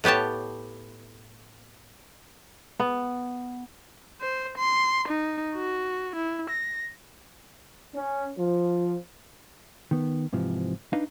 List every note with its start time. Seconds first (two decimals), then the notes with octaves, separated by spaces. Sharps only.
0.04 A2 B3 G4 C#5 A5
2.80 B3
4.21 C5
4.58 C6
5.08 D#4
5.55 F#4
6.16 E4
6.50 A#6
7.95 C#4
8.38 F3
9.91 D#3 B3
10.33 G#2 C3 E3 F3
10.93 D4 D#4 B4 F5